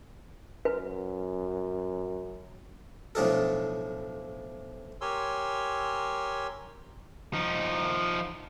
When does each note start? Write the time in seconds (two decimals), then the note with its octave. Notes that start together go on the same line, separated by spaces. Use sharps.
0.65 F#2 B4
3.15 B1 A2 F3 D4 G#4 A4
5.01 G4 A#4 C#5 G#5 C6 E6
7.34 F3 D#4